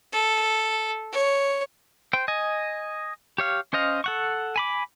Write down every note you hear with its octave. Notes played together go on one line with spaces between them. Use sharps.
A4
C#5
C5 G5
D#5 G#5
G4 C#5 F5
C#4 C5 D#5 F5
A4 F#5 C#6
G#5 B5 D6